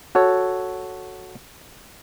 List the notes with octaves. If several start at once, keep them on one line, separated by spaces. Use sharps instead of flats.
F#4 A4 C#5